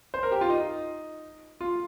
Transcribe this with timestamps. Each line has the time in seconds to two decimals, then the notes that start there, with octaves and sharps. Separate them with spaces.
0.14 C5
0.23 A#4
0.31 G4
0.41 F4
0.50 D#4
1.61 F4